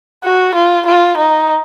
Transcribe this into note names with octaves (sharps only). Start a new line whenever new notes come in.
F#4
F4
F4
D#4